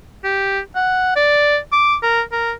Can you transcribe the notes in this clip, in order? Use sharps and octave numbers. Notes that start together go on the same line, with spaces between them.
G4
F#5
D5
D6
A#4
A#4